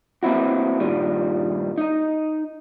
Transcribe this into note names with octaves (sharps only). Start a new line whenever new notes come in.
A#3 C4 C#4 E4 F#4
G2 A#2 D#3 G3
D#4 D#5